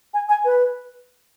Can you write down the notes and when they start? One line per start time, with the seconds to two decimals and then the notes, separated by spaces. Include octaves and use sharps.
0.14 G#5
0.29 G#5
0.45 B4